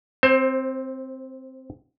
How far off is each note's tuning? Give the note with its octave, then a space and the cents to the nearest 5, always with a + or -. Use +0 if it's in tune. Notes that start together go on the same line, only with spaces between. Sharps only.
C4 +0 C5 +25